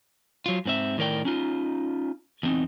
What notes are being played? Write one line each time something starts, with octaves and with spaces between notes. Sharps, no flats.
F#3 F4
G#2 C4 E5
A2 D#3 A#4 D5 G5
C#4 D#4 F4
E2 C4 D#4